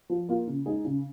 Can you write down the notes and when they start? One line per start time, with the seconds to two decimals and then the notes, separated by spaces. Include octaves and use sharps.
0.10 F3
0.29 A#3 F4
0.47 C#3
0.66 G#3 D#4 G#4
0.85 C#3